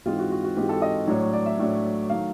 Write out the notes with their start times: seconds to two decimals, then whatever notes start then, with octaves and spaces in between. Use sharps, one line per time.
0.06 G#2 E3 G#3 C4 F4
0.19 F#4
0.31 F#4
0.44 F#4
0.56 G#2 E3 G#3 C4 G4
0.69 A4
0.82 D#5
1.07 A2 F#3 A3 D4 C#5
1.20 C#5
1.33 D5
1.46 E5
1.59 A2 F#3 A3 D4
2.09 D#3 F#3 A3 F5